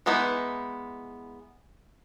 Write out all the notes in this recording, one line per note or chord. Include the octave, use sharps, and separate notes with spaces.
E3 G#3 B3 D#4 E4